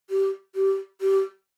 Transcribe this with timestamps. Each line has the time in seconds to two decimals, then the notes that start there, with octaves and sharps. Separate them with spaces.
0.10 G4
0.55 G4
1.01 G4